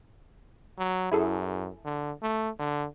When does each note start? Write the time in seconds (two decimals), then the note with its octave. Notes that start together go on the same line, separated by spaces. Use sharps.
0.78 F#3
1.12 F#2 E4 G#4 A4
1.85 D3
2.22 A3
2.59 D3